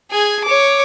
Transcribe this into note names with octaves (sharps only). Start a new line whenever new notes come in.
G#4 G#5
C#5 D6